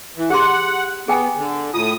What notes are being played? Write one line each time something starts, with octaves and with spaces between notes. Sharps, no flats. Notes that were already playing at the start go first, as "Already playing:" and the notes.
E3
G4 G#4 F#5 C6
B3 G#4 G5 G#5
D3
A2 F4 D#6